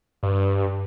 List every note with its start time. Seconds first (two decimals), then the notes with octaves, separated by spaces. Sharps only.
0.23 G2